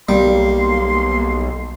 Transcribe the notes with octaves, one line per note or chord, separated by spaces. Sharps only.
B1 G3 A#3 C6